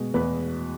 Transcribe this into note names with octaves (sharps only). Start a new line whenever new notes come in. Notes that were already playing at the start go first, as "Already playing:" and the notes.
Already playing: B2 G#3
E2 B4